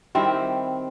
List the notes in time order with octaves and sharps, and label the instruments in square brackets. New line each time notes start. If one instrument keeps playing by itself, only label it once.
[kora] D#3 G3 C4 E4